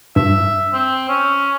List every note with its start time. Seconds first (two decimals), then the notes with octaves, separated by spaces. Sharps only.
0.16 G2 E5
0.73 C4
1.09 C#4